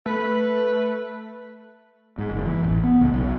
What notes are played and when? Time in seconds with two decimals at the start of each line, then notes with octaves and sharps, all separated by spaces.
0.06 A3 B4
2.18 G#2
2.31 F#1
2.45 E3
2.64 A1
2.84 B3
3.01 C#2
3.14 B1